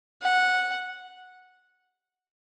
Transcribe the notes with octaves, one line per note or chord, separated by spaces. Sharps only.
F#5